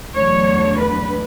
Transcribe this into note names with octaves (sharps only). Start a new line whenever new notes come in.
E2 D3 F#3 A3 D4 C#5
B4